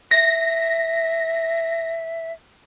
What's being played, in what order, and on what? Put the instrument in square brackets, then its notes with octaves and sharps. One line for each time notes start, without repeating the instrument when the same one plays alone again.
[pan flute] E5 [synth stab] A#6